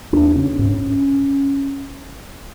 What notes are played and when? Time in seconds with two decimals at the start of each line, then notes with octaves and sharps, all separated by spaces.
0.13 E2 D4
0.35 C#3 C#4
0.59 G#2 C#4